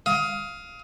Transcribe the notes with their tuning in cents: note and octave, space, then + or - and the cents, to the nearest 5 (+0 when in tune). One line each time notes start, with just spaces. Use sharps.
F5 +0 D#6 +25